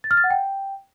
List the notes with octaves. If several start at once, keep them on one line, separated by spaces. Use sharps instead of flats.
A6
F6
A6
F#5
G5